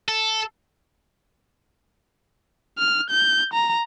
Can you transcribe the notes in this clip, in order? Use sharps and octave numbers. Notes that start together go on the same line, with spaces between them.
A4
F6
G6
A#5